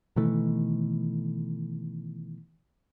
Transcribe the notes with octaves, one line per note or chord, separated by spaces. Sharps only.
B2 D#3 E3 A3